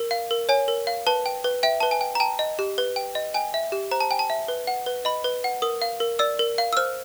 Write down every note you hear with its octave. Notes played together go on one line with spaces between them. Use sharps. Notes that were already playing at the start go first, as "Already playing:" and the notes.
Already playing: A#4
F5
A#4
C#5 G#5
A#4
F5
B4 A5
G5
B4
E5 G5
B4 A5
G#5
G5
A#5
G5 A5
D#5
G4
B4
G5
D#5
G5 G#5
E5
G4
C5 A#5
A5
G5 G#5
A5
E5
B4
F#5
B4
D#5 B5
B4
F#5
A#4 D#6
F5
A#4
D5 E6
A#4
F5
E6
C5 F6